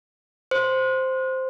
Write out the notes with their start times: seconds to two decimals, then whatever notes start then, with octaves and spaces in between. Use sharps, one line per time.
0.51 C5